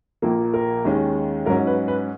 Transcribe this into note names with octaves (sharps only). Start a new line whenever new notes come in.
A#1 A#2 F3 A#3
A#4
D#2 D#3 G#3 C#4
G#2 F#3 C#4 A#4
B4
B4